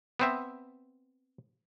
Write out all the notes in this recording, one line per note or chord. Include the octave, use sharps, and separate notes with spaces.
B3 C4 E5